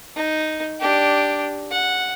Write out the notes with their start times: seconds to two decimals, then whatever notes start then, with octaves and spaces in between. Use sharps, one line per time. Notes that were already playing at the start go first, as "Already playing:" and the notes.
0.16 D#4
0.81 D4 G4
1.71 F#5